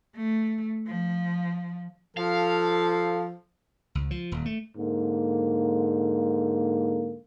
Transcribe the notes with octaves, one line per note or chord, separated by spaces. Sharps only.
A3
F3
F3 A4 F5
C#2
F3
D#1
A3
G#2 D3 A#3